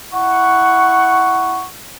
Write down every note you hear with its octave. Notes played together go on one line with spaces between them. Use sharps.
E4 F#5 C#6